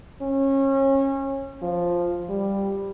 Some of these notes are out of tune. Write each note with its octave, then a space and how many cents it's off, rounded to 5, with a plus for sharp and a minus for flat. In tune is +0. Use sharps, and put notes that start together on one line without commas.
C#4 -25
F3 +0
G3 +5